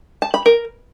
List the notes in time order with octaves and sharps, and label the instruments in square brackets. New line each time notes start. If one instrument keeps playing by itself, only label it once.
[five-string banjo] A5
B5
A#4